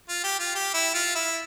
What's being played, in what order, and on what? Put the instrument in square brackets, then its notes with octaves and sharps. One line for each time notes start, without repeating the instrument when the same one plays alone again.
[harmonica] F4
G4
F4
G4
E4
F4
E4